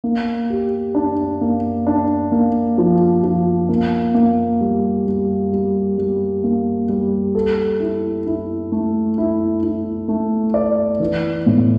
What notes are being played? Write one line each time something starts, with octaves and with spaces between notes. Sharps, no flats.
A#3
G4
D4
A#3
D4
A#3
F3
F3
A#3
A#3
G3
G3
G3
G3
A#3
G3
A4
E4
E4
A3
E4
E4
A3
D5
E3
A2